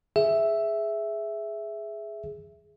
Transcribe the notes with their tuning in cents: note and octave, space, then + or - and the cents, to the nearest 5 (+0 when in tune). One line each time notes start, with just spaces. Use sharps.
G#4 +5 E5 +0